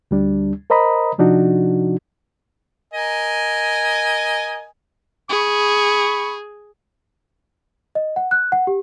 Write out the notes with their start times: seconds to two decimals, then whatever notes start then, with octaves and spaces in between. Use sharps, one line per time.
0.11 D2 G3 D4
0.70 A#4 C5 D#5 A#5 B5 D#6
1.18 C3 F3 D4 D#4 F#4
2.94 A#4 D#5 G#5
5.30 G#4 B5 C#6
7.95 D#5
8.16 F#5
8.31 F#6
8.52 F#5
8.67 G4